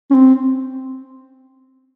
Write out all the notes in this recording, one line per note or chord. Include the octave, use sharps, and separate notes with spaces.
C#4
C4